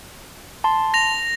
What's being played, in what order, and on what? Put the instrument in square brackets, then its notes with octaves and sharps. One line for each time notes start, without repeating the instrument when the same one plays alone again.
[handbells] A5 C6
[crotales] A#6 F7